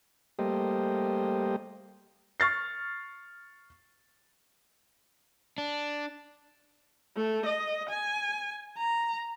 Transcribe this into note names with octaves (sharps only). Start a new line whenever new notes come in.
G3 A3 A#3 G4 C5 D#5
C#6 F6 A6 C7
D4
A3
D#5
G#5
A#5